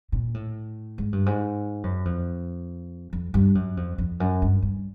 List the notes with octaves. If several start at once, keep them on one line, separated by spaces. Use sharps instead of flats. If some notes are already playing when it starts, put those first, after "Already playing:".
A#2
A2
G#2
G2
G#2
F#2
F2
F2
G2
F#2
F2
F2
F#2
G2
G2